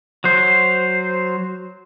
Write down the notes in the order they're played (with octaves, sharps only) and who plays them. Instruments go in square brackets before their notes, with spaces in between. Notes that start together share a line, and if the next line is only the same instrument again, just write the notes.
[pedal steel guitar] F#3 C5